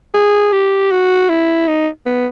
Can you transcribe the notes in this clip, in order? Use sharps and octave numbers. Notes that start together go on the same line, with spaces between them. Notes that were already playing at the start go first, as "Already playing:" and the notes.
G#4
G4
F#4
E4
D#4
B3